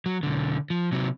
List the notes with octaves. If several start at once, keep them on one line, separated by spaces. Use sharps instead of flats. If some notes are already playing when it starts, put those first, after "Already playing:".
F#3
B1 D3
F3
C3 F#3